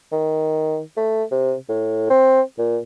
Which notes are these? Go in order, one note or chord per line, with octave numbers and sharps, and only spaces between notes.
D#3
A3
C3
A2
C4
A#2